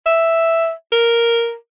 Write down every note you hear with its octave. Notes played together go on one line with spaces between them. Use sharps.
E5
A#4